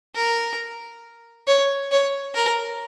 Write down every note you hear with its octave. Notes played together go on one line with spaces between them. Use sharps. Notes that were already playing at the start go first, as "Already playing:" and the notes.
A#4
C#5
C#5
A#4